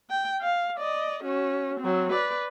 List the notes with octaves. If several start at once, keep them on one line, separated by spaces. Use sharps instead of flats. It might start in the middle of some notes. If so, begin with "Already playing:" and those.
G5
F5
D5 D#5
C#4 F#4
F#3 C4
B4 D5